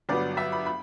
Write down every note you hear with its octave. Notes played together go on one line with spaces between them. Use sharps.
G1 G2 F#3 B3 D5
E5
B5
B5